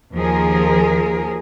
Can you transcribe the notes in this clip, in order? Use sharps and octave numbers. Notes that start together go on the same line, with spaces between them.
D#2 F3 G#4 A#4